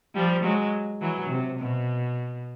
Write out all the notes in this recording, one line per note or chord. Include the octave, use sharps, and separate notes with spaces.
F3 G3
F#3 G#3
E3 F#3
C3
B2